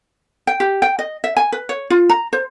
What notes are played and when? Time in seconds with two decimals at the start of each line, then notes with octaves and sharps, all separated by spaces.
0.47 G5
0.60 G4
0.82 G5
0.99 D#5
1.24 E5
1.37 G#5
1.52 B4
1.69 C#5
1.90 F4
2.09 A#5
2.33 C5